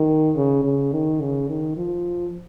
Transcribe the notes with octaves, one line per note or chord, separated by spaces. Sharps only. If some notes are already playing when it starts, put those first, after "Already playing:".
Already playing: D#3
C#3
C#3
D#3
C#3
D#3
F3